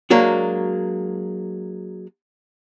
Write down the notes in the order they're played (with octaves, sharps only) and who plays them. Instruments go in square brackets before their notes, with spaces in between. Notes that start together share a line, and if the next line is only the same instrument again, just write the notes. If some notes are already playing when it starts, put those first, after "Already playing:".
[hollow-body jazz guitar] F#3 G#3 A#3 D4 F#4